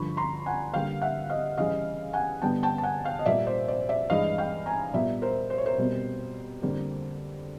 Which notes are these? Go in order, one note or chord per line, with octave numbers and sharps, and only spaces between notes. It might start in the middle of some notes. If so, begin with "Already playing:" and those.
Already playing: G2 D3 F3 B5 C#6
A#5 C6
F#5 G#5
D3 G3 A#3 F5 G5
E5 F#5
D#5 F5
C#3 E3 G3 D#5 F5
F#5 G#5
G2 D3 G3 B3 G5 A5
G5 A5
A5
F#5 G#5
F5 G5
D#5
A#2 G3 A#3 D5 E5
C5 D5
C5 D5
D5 E5
G2 E3 G#3 D#5 F5
F5 G5
G#5 A#5
A#2 G3 B3 D5 E5
A#4 C5
C5
C#5
A#4 C5
B2 G3 C4
F2 D3 G3 A#3